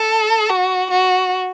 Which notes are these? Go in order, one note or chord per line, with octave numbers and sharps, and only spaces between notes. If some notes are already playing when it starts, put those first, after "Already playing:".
Already playing: A4
F#4
F#4